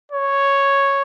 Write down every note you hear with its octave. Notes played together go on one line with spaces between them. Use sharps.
C#5